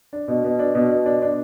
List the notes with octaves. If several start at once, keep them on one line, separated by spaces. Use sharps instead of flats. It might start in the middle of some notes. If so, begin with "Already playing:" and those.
D4
B2
B2
D4
B2
B2
D4
D4